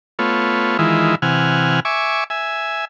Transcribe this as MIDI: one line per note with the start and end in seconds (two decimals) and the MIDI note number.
0.19 0.77 57
0.19 0.77 59
0.19 0.77 65
0.19 0.77 73
0.79 1.15 51
0.79 1.15 52
0.79 1.15 56
0.79 1.15 64
0.79 1.15 65
1.22 1.80 48
1.22 1.80 52
1.22 1.80 78
1.22 1.80 80
1.22 1.80 89
1.85 2.24 76
1.85 2.24 80
1.85 2.24 85
1.85 2.24 86
2.30 2.85 76
2.30 2.85 80